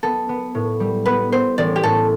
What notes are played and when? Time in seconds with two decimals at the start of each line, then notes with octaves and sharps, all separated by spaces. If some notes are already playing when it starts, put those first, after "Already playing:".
0.03 B3 A4
0.29 B3
0.55 A2
0.80 G3
1.06 B3 B4
1.32 B3 C5
1.58 A1 D5
1.76 G4
1.83 A2 A4